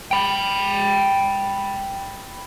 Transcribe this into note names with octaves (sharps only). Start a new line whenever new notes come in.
G5 B5